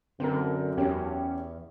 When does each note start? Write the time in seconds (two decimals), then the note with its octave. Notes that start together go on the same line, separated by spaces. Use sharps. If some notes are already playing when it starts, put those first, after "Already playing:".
0.20 F#2 D3 C4 A#4
0.78 E2 C#4 G4